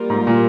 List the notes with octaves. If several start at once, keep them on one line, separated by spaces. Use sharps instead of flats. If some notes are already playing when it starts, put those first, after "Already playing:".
Already playing: G3 A#3 F4 A#4
G#2
A#2